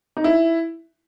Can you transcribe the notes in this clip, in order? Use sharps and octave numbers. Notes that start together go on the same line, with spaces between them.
D#4
E4